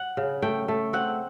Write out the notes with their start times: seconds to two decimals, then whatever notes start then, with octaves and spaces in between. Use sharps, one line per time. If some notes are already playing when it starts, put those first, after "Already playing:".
Already playing: F#5
0.17 C#3
0.42 A3 G5
0.68 A3
0.93 C4 F#5